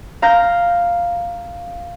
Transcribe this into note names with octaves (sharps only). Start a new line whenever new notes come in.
F5 A#5 F6 G6